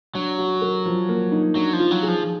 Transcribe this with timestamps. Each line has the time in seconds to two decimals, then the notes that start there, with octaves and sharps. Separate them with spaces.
0.15 F#3 D4
0.38 F#4
0.62 A#4
0.86 F3
1.09 A#3
1.32 D#4
1.55 F#3 D4
1.73 F3
1.79 F4
1.91 F#3
2.03 G#4
2.08 F3